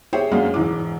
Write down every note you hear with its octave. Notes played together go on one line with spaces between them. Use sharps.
G4 G#4 C5 C#5 E5 G5
F#2 G#3 A#3 D4
E1 G#2 E3 D6